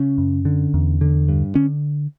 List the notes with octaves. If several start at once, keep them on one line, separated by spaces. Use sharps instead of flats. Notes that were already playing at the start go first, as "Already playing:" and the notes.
Already playing: C#3 C#4
F#2
D3
E2
D3
G2
D3 C#4